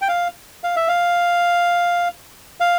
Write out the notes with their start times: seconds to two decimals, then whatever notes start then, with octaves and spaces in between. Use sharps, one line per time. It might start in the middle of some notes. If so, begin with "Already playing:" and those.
0.02 G5
0.08 F5
0.64 F5
0.76 E5
0.88 F5
2.60 F5